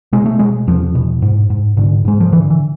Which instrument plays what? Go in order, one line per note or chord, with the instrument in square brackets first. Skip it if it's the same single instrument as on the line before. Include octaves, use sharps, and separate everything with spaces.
[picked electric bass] B2 G#3
A3
B2 G#3
E2 F3
B2
G#2
G#2
G#2 D3
G#2 G#3
F3
D3 E3
E3